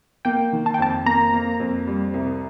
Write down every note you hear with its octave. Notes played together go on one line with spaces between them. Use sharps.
A#3 G5
D#3
A5
G5
F2 A5
A#3 A#5
A#3
F2
G3
C2